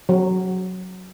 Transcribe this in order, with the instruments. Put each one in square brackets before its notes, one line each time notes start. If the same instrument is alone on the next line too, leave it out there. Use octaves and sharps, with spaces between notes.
[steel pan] F#3